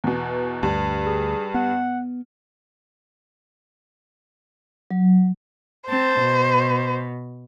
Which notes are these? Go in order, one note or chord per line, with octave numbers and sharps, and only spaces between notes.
E2 B2
D2 G2
G#4
B3 F#5
F#3
C4 C5 A5
B2